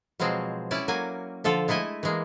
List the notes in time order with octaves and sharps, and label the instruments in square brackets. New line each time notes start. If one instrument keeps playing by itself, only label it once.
[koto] B2 F3 F#3 G#3 C4
C#4 E4 D5 F#5
F#3 A#3 G#5
D3 F3 F4 A4
G#3 A3 E4 D#5 G#5
E3 G#3 A#3